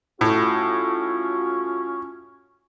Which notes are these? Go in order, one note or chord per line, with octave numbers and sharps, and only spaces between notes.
A2 C#4 F4 F#4